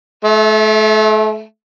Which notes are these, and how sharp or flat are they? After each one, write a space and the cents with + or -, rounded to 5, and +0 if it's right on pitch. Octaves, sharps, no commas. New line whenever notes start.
A3 -35 E5 +0